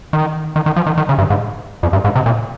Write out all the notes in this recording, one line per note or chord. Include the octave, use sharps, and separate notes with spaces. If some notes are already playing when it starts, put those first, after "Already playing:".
D#3
D#3
D#3
F3
D#3
D#3
C#3
G2
G#2
F2
G2
G#2
C3
A#2